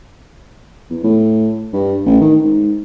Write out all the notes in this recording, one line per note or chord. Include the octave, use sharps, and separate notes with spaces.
E2
A2
G2
A1
D#3
G#2